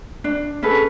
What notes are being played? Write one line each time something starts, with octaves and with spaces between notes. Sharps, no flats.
D4
C#4 G#4 A4 B4